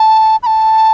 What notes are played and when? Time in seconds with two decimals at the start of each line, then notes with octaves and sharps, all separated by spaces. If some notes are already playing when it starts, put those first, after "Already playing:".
Already playing: A5
0.43 B5
0.46 A5